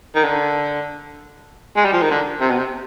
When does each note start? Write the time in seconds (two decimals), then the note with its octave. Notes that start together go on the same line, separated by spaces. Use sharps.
0.15 D#3
0.24 D3
1.76 G#3
1.85 G3
1.93 F3
2.02 D#3
2.11 D3
2.41 C3
2.50 B2
2.58 C3